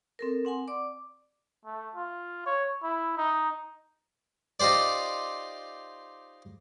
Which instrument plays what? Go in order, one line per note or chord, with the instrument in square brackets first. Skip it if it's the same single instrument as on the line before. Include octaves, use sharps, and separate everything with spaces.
[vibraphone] C4 A4 A#4
C4 F#5 G#5 C6
D5 D6
[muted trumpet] A3
F4
C#5
E4
D#4
[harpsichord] D#4 F4 G4 C5 D5